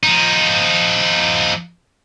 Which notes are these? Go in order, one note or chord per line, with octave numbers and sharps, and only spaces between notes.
F3 D#4